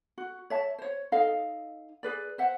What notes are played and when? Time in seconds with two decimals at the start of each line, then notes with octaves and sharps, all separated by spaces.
0.18 F#4
0.50 C#5 E5 A5
0.79 C5 C#5
1.12 D#4 A4 D#5 F5
2.03 G#4 B4 D5
2.38 C5 E5 F#5